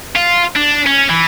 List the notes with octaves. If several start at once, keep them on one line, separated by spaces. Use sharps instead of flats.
F4
D4
C#4
E3